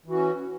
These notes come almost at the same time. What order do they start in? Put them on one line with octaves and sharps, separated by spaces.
E3 F#4 C#4